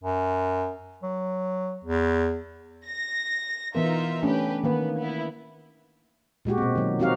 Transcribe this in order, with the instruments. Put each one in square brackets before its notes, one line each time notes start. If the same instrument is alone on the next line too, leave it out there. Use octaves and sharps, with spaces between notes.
[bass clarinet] F#2
F#3
E2
[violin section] A#6
[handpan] E3 B3 A#4 [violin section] D#4 F4 E5
[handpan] A3 C#4 D4 [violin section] G4 B4
[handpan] D#3 A#3 B4 [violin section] B3
[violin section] B3 E4
[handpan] A#2 G#3 F#4 G4
B2 C4
D#3 F#3
F3 C4 D#4 F#4 G4 F5